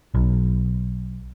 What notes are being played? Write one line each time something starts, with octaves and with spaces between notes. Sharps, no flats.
B1